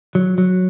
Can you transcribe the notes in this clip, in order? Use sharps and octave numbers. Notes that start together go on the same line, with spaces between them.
F#3
F#3